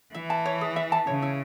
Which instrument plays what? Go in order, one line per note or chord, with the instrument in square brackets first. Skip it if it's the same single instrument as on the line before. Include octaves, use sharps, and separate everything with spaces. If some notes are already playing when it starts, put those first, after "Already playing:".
[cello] E3 [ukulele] E5
[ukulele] A5
C#5
G#4
E5
A5
[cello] C#3 [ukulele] C#5
[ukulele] E4